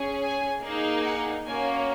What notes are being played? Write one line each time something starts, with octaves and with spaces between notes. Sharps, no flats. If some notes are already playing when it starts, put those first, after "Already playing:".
Already playing: C#4 G#4
G#5
A#3 D#4 G#4
F#5
A#3 C#4 F#4 G#5